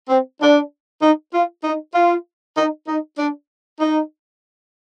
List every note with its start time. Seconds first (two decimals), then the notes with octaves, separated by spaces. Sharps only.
0.09 C4
0.40 D4
1.02 D#4
1.32 F4
1.64 D#4
1.95 F4
2.57 D#4
2.87 D#4
3.18 D4
3.80 D#4